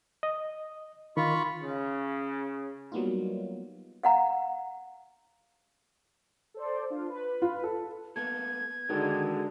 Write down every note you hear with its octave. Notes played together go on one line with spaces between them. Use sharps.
D#5
D#3 F4 B5 C#6
C#3
F#3 G3 A#3 B3 D#4 F4
F5 F#5 A#5
A4 C5 D5
D4 F4
B4
F4
A4
A#3 B3 A4 G#6
D3 D#3 G#3 F#4 A4 A#4